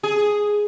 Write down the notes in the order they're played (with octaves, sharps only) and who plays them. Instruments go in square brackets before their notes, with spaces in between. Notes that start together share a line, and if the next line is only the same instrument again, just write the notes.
[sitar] G#4